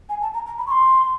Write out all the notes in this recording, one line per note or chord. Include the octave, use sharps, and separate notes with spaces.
G#5
A5
A#5
A#5
B5
C#6
C6